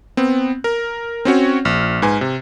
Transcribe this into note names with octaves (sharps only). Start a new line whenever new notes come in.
B3 C4
A#4
C4 C#4 F#4 C#5
A#1 F6
G#2 B4 G#5
C3